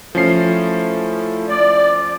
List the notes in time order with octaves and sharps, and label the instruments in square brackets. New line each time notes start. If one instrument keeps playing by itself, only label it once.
[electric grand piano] F3 C#4 C7 [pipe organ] A3 E4
[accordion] D5